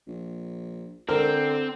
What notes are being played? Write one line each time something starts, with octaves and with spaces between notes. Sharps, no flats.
A#1
D3 C4 A#4